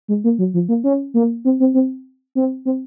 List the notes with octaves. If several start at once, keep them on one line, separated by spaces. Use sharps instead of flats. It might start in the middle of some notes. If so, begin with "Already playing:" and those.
G#3
A#3
F#3
F3
A#3
C#4
A#3
C4
C4
C4
C4
C4